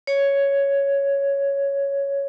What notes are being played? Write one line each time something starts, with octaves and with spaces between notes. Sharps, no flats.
C#5